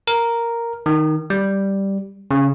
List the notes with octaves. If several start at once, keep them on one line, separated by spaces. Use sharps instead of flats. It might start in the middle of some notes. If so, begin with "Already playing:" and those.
A#4
D#3
G3
C#3